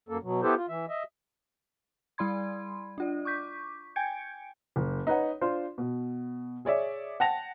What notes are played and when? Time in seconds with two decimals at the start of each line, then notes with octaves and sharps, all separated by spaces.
0.09 F#2 A#3 A4
0.23 B2 F#3
0.42 B3 E4 G4 A4 B4 C5
0.56 F4
0.69 E3 E5
0.89 D#5 E5
2.18 G3 E4 D5 B5 C6 G#6
2.98 D4 F4 D5
3.25 C#6 D6 G6 B6
3.96 G5 G#5 G6 G#6 C#7 D7
4.76 F#1
5.07 D#4 B4 C#5 F#5
5.41 D4 F4 C5
5.78 B2
6.65 G#4 C#5 D5 E5
7.20 F#5 G5 A5 A#6 F7